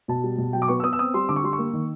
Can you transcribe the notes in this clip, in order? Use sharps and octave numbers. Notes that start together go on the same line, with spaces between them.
B2 A5
G3
B2
F#3 G5
D6
B3 C#6
E6
B3 D#6
E6
C4 D#6
G3 C6
D3 D6
C#6
G3 C6
C#6
A#3
D#3